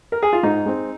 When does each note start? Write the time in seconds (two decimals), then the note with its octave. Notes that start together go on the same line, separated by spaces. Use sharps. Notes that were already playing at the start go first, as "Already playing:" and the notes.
0.12 A#4
0.23 G#4
0.33 F4
0.43 G#2 D#4
0.66 G#3 C4